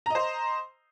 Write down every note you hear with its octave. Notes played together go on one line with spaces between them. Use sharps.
C5 D#5 A#5